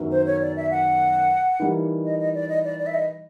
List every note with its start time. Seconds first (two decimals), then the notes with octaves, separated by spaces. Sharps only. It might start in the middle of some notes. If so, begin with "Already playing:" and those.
Already playing: F#2 D#3 F#3 B3
0.11 C5
0.26 C#5
0.42 D5
0.56 E5
0.71 F#5
1.60 E3 G3 A#3 D#4
2.05 D#5
2.19 D#5
2.35 D5
2.49 D#5
2.64 D5
2.79 D5
2.86 E5
2.94 D#5